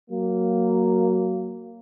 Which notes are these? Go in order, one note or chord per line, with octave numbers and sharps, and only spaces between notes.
F#3 A#3